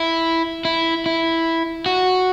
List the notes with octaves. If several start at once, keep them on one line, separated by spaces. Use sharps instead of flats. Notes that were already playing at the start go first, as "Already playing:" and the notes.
Already playing: E4
E4
E4
F#4